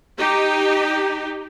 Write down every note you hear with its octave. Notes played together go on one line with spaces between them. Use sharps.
D#4 G4